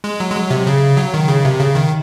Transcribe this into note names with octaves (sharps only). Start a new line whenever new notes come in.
G#3
F#3
G#3
F#3
C3
C#3
F#3
D#3
C#3
C3
C#3
D#3